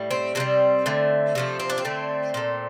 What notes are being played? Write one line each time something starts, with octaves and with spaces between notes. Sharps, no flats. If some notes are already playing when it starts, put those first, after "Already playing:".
Already playing: A2 G3
C4
C3 E3 G3 C4
D3 A3
C3 F3 A3
C4
D4
C4
D3 A3
A#2 A3